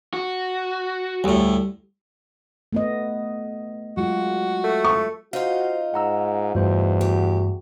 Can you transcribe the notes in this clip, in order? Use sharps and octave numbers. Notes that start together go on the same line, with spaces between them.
F#4
D2 A2 G3
A3 B3 D#5
F#3 G#3 F4 F#4
A3
C#6
D#4 F4 F#4 C5 F5
G#2 F#5 A#5 E6
E2 G2 G3 A3 F#4 C5
F#4 G4